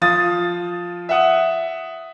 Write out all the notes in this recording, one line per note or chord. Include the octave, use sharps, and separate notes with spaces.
F3 F4 D#6 A6
E5 F#5 D#6